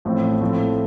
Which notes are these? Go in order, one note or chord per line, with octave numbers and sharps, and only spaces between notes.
A1 A2 F3 C4
A2 F3 A3 C4 E4